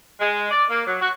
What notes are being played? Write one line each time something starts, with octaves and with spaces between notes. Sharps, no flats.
G#3
D5
A#3
F#3
F#4